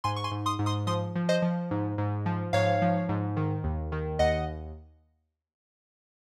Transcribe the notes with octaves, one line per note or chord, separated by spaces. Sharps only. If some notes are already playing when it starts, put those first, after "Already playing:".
G#2 G#5 C6
C#6
G#5 C6
G#2
C6 D#6
G#2
C6 D#6
F3 C6 D#6
F3
C5 D#5
F3
G#2
G#2
F3
G#2 C#5 F5
F3
G#2
D#3
D#2
D#3
D#2 D#5 F#5